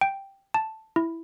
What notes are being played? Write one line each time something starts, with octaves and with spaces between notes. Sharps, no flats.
G5
A5
E4